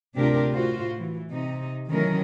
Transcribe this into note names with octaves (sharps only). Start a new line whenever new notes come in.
D2 C3 D4 F4 G4 A#4
A2 F4 F#4 C5
E3
C3 D#4
D#3 E3 F#3 A3 C#4 A#4